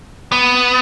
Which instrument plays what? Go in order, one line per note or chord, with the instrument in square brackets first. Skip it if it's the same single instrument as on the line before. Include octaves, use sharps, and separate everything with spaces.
[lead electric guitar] B3